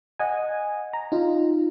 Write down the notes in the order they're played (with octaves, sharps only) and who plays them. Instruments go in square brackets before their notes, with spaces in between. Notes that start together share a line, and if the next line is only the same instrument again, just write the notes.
[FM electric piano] D#5 F#5 G#5
A#5
D#4 F4